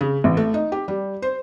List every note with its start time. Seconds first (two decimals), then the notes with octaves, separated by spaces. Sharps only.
0.01 C#3
0.24 A1
0.37 A3
0.54 D#4
0.72 G4
0.88 G3
1.22 C5